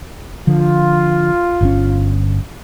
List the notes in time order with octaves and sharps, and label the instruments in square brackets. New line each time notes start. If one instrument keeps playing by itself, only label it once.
[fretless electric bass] D3 F3 [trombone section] F4
[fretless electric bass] G1 C3 C#4